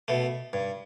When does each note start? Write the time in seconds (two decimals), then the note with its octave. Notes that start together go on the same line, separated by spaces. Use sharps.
0.08 B2 A3
0.53 G2